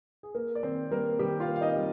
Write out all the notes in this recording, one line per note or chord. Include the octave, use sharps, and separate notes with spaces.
G#4
A#3 A#4
D5
D#3 C4 C5
G3 A#3 A#4
D#3 G3 G4
F4 F5
A#3
F5
D#4 D#5
G3